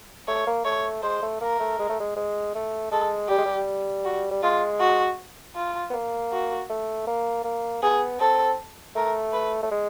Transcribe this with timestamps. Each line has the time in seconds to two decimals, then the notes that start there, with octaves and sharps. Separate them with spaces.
0.28 A3 C#5
0.47 A#3
0.65 A3 C#5
1.02 G#3 C5
1.22 A3
1.41 A#3 A#4
1.60 A3
1.79 G#3
1.89 A3
2.00 G#3
2.16 G#3
2.55 A3
2.91 G#3 A4
3.29 G3 G4
3.38 G#3
3.45 G3
4.05 F#4
4.31 G3
4.43 G#3 F4
4.80 F#4
5.56 F4
5.90 B3
5.93 A#3
6.32 F#4
6.70 A3
7.07 A#3
7.44 A#3
7.82 B3 G#4
8.20 C4 A4
8.96 A3 A#4
9.33 B4
9.63 A3
9.71 G#3